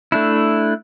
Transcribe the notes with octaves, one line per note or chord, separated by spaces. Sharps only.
A3 D4 E4